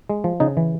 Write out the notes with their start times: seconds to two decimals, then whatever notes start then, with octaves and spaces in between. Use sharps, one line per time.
0.09 G#3
0.24 F3
0.40 C#3 D#4
0.57 E3